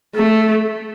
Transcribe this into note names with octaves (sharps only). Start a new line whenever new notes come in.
A3